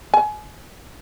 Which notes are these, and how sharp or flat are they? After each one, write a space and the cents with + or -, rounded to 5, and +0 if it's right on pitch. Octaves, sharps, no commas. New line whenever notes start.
G#5 +30